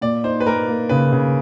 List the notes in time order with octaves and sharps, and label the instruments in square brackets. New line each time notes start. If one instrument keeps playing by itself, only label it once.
[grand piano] A#2 [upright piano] D5
[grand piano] D#4 [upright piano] C5
[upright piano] B4
[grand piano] A#3 [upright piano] A#4
[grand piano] A#3
[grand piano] C#3 [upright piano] B4
[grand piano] C#3